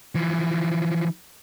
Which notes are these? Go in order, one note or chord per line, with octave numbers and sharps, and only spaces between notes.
E3 F3